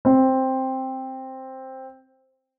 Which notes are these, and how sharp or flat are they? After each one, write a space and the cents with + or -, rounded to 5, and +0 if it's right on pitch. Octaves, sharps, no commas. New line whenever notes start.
C4 +5